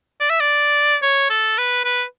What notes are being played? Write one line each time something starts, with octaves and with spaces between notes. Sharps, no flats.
D5
E5
D5
C#5
A4
B4
B4